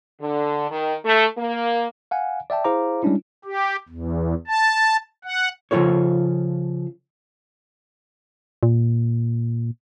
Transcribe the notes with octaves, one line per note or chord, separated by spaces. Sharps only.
D3
D#3
A3
A#3
F5 F#5 G#5
D5 E5 G5 A5
E4 G#4 C5 F5 A#5 D6
G3 G#3 C#4 D4 E4
G4
E2
A5
F#5
C#3 F3 G3 F4 A4 C#5
A#2